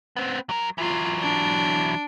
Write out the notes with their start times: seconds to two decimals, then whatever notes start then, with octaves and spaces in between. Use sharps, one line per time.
0.16 B3 C4
0.49 F#3 A#4
0.78 E3 F#3 F4
1.21 D4